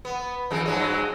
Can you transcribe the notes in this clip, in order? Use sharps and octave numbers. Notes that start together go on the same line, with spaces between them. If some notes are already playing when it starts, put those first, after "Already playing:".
B3
F2 E3 G#3
G2 F#3 G#3